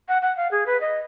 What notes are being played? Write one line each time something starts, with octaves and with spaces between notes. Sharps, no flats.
F#5
F#5
F5
G#4
B4
D#5